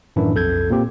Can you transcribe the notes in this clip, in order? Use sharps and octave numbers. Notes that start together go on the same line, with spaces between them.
F#2 A2 D#3 E3 D4 E4
B1 F2 A4 G6 G#6
A#2 A#3 C4 G4